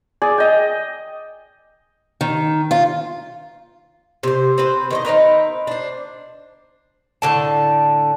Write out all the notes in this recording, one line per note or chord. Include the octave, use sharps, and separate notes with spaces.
G#4 D5
D#5 G5
D#3
F4
C3 C5
C4 B4 C5
D#3 C5 D#5
C4 D#4 A#4 B4
D4 C5
A2 D3 A5